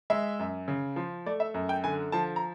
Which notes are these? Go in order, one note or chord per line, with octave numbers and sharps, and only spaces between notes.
G#3 E5
F#2
C#3
F3
A3 D5
E5
F#2
G5
D3 G#5
F3 A5
A#5